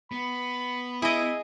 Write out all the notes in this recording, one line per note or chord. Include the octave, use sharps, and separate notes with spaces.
B3 B5
E4 G#4 D#5